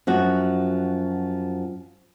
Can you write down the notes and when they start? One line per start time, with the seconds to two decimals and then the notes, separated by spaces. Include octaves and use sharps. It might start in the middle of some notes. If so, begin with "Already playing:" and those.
0.07 F#2 F3 F#4